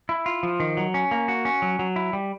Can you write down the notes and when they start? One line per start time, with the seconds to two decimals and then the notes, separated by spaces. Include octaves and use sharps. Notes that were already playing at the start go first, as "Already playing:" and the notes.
0.09 E4
0.26 F4
0.43 F3
0.60 D#3
0.77 F#3
0.94 C#4
1.11 A#3
1.28 F#4
1.45 C#4
1.62 F#3
1.79 F#3
1.96 E4
2.13 G3